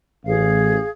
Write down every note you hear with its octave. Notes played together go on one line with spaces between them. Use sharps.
A1 G#4 F5